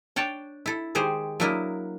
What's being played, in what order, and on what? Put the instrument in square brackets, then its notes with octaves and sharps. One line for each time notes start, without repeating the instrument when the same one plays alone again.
[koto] D4 C#5 G5 A5
E4 A4
D#3 G#3 G4 G#4 C5
F#3 A#3 D4 E4 A#4 D#5